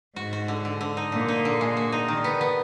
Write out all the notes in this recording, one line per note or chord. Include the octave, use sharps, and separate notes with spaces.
G#2 F#4
F#4
D3
D3
D3
D#4
A#2 D3
D#4
D3
G#3
F#4
D#4
D3 D#3
B3
B3